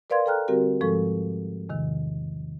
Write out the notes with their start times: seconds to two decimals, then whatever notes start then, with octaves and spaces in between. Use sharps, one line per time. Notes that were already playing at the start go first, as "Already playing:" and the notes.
0.10 A#4 B4 D5 F5 C6 G#6
0.26 A4 B4 G5 A#5 F6 F#6
0.48 D3 G3 C4 F#4 G4 A#4
0.81 G#2 F3 G#3 A4 C#6
1.69 E2 C3 D#3